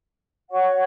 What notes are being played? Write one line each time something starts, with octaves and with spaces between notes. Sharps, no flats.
F#4 C#5 F#5 C#6